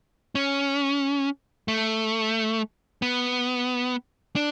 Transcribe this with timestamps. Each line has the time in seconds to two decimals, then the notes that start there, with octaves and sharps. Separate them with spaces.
0.35 C#4
1.68 A3
3.02 B3
4.36 D4